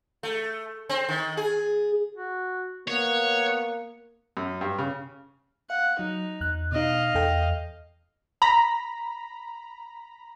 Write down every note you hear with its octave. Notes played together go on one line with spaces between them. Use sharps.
A3
C4
D#3
G#4
F#4
A#3 B3 C#5
F#2
G2
C#3
F5 F#5
F#3 D#4
E2 F#6
B2 D#4 D#5 F5
E2 A4 G5
A#5 B5